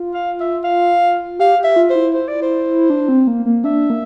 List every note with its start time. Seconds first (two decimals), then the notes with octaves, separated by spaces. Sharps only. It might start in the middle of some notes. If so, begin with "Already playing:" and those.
Already playing: F4
0.14 F5
0.40 E5
0.64 F5
1.39 G4 F5
1.59 G4
1.64 E5
1.76 F4
1.90 C5
1.95 E4
2.14 C5
2.28 D5
2.42 C5
2.90 D4
3.09 C4
3.27 A#3
3.46 A#3
3.64 D4 E5
3.90 A#3